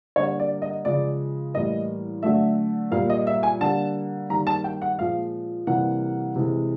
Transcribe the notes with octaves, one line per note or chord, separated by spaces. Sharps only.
D3 G3 A#3 C#5
D5
D#5
C#3 F3 G#3 D5
A2 E3 G3 A#3 D#5
D3 F#3 A3 E5
A#2 G3 A#3 F5
D#5
E5
G#5
D3 G3 A#3 A5
D#3 G3 A#3 A#5
A5
G5
F#5
A#2 F3 G#3 F5
C3 E3 G3 A#3 F#5
C3 E3 G#3